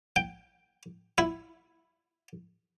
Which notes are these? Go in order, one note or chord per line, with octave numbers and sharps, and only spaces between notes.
G5
E4